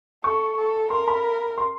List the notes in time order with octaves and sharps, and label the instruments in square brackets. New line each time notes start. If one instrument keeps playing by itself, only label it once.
[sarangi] A4 [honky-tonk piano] C#6
[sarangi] A4
[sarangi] A#4 [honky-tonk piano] C6
[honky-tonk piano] B5
C6